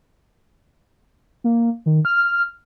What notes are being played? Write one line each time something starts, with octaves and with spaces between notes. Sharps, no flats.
A#3
D#3
F6